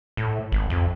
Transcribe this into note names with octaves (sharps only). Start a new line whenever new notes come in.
A2
G#1
F2